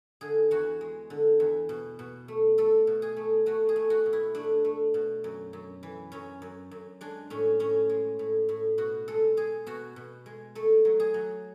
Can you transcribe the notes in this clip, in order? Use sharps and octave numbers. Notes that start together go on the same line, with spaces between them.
D3 G#4
E2 F#4
G#3
D3
E2
B2
B2
A3
A3 A4
B2
G#4
A3
A3 F#4
G#4
A3
F#4
B2
E4
A3 D4
A3
B2
F#2
F#2
E3
F#2 C#4
F#2
F#2
G#3 D4
A2 C#4
A2 C#4
G#3
A2
A2
B2 F#4
G#3 A4
G#3 G#4
B2 F#4
B2
G#3
A3 A4
F#3
G#4
F#3